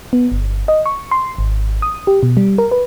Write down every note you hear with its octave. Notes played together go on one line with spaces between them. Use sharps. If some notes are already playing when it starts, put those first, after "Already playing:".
B3
G1
D#5
C#6
C6
G#1
D#6
G4
B2
G3
A#4
B4